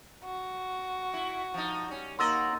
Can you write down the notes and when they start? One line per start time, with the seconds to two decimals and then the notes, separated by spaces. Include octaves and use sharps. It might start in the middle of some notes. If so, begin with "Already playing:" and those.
0.24 F#4
1.14 E4
1.54 F3 D#4
1.88 G3 C#4
2.19 A#3 D#4 F#4 A#4 D#5 C6 E6 A6